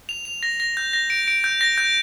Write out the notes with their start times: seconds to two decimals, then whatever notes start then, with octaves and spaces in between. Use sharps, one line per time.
0.09 F7
0.25 F7
0.43 A#6
0.60 A#6
0.77 G6
0.93 A#6
1.10 D7
1.28 D7
1.44 G6
1.61 A#6
1.78 G6